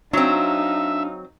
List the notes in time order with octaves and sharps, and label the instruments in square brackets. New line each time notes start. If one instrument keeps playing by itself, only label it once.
[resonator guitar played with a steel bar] F#3 C4 [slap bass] D4 [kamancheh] D#4 F5 [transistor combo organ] E5